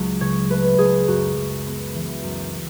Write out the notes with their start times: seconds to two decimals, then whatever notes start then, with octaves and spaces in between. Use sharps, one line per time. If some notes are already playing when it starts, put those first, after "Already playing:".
Already playing: C#2 F#3
0.21 C#3 C#5
0.50 A3 B4
0.78 C#2 G#4
1.07 F#2 F#4
1.36 F#2
1.66 B3
1.95 E3
2.23 F#2